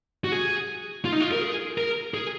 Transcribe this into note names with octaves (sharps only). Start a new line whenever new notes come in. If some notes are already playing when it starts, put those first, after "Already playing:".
F#4
G#4
F4
D#4
F4
A#4
G#4
A#4
G#4